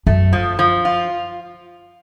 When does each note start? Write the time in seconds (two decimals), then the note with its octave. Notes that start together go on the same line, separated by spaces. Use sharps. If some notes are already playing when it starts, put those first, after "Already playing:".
0.07 F#2 A3
0.33 F3
0.59 F3
0.85 F4